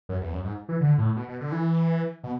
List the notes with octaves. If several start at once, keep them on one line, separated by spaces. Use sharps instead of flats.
F#2
E2
F#2
G#2
E3
D3
A2
B2
B2
D3
E3
B2